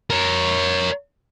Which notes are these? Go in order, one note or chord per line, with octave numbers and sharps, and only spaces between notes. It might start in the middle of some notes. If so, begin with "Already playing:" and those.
A#4 C#5